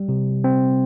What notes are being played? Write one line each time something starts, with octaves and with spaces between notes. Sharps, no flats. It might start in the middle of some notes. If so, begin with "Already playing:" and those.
Already playing: G3
C3
C4